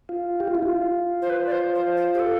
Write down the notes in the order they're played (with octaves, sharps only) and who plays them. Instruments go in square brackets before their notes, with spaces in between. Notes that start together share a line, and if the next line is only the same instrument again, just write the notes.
[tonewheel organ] F4
G4
F4
E4
F4
[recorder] C5
B4
D5
C5
C5
C5
G4
A4